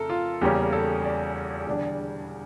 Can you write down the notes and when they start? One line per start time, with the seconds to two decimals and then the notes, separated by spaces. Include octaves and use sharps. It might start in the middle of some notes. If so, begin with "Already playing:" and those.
Already playing: F2 C#3 A3 A4 A#4
0.10 F4
0.41 E2 C#3 G3 A#3 C#4 G4
0.73 A4
1.05 D5
1.67 E1 E2 D3 G3 D4